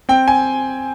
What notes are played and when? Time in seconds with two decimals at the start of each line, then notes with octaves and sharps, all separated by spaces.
0.09 C4 G5
0.28 G#5